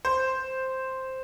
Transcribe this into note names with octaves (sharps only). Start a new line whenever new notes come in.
C5